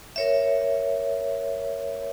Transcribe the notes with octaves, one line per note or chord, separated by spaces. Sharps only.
A#4 C#5 E5